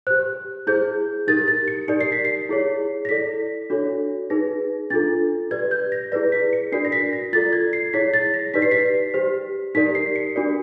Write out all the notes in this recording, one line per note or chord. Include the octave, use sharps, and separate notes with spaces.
G4 C5 F#6
E4 G#4 C5 G6
D#4 G4 A#4 A6
A6
C#7
D#4 G4 A#4 D5 C#7
C7
B6
C7
E4 G#4 C#5
A#6
E4 A4 D5 B6
D4 F#4 A4 C#5
D#4 G#4 B4 A#6
D4 F4 A4 A6
G4 B4 D5 G#6
G6
A#6
E4 G#4 B4 D5 A#6
B6
C#7
D4 F#4 A#4 D5 C7
A#6
B6
A#6
F4 A4 D5 A6
G#6
C7
E4 G#4 C#5 B6
A6
A#6
D#4 G4 B4 D5 B6
C7
B6
G4 C5
D#4 G4 A#4 D5 B6
C7
C#7
D4 F#4 A#4 D5